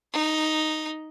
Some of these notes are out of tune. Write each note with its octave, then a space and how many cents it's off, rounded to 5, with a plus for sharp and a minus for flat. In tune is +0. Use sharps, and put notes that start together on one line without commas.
D#4 +0